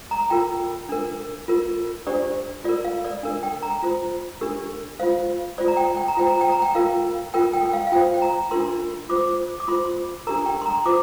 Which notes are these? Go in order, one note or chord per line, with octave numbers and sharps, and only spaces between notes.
A#5
F4 A#4 G5
D4 A#4
F4 A#4
D4 G4 C5 D5
F4 A#4 D5
F5
D5
D4 A#4
G5
A#5
F4 C5
D4 G4 A#4
F4 C5 F5
F4 C5 D5
A#5
G5
G5
A#5
F4 C5 G5
A#5
G5
A#5
G5
F4 A#4 F5
F4 A#4 G5
G5
G5
F5
F5
F4 C5 G5
G5
A#5
D4 F4 A#4 C6
F4 C5 D6
D6
F4 C5 C6
D4 G4 A#4 A#5
G5
C6
A#5
F4 C5 D6